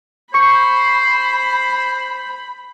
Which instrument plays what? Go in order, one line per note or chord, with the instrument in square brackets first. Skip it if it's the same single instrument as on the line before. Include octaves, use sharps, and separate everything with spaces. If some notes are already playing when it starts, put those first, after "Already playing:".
[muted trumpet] C5 [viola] B5 [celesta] C#6 C#7